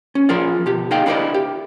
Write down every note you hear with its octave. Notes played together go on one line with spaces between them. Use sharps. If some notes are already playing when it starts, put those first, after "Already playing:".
C#4
F3 F4 G#4 A#4 D5
B2 G4
D#4 G#4 D#5 F5 G5
D4 E4 A#4 C5 D5 D#5
G4